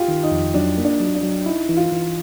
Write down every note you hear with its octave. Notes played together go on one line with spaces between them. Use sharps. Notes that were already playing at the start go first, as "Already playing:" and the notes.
Already playing: F4 G4
D#3
D#4
F2
F#3 D4
A#3
D4
F#3
D4
F#3
D#4 E4
E3
F4
E3